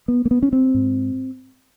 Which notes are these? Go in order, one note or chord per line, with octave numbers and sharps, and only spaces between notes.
B3
A#3
B3
C#4
C4
G#2